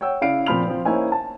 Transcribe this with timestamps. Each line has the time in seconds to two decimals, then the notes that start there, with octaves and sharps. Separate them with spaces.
0.01 C#5 F#5 G5 E6
0.21 C#3 E4 D5 F5 C7 D7
0.46 A#2 F3 C4 B5 F6 F7
0.66 F3 C4
0.85 A#3 C#4 D#4 E4 C5 G#5
1.12 A5